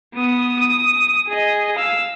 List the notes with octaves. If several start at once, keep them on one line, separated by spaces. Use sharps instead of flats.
B3 D#6
D#6
G#4 D#5
F5 E6